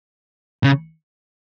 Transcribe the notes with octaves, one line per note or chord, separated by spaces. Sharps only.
C#3